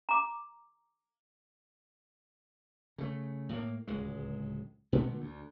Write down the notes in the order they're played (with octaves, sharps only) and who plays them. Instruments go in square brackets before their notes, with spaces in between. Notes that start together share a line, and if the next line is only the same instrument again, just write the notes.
[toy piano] A#5 D6
[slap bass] C#3 A3
A2 A#3
D1 C#2 G#3
A#2 D3 G#3 A3
D2